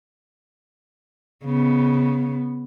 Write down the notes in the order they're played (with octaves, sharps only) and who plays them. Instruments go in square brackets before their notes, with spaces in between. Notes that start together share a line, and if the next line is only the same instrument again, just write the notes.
[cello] C#3 B3